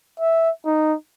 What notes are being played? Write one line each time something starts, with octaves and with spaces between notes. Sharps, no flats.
E5
D#4